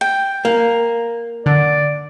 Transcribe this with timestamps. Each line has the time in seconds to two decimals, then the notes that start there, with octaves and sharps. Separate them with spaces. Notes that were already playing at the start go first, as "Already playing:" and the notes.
0.01 G5
0.45 A#3
1.46 D3 D5